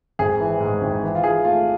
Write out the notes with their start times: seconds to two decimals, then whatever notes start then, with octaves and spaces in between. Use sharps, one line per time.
0.19 G#1 G#4
0.40 E3
0.60 G#2
0.81 G#1
1.03 E3
1.15 F4
1.24 E3 G#4
1.45 A3 F4